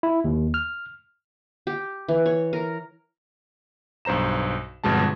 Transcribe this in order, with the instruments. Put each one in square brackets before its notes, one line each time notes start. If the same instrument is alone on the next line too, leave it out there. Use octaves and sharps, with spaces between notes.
[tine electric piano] E4
D#2
F6
[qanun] G4
E3
C#5
A#4
[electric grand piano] B1 G2 C5 A#5 E7
G1 F2 B2 G#3 A5